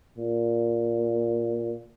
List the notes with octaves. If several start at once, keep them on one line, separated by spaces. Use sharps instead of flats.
A#2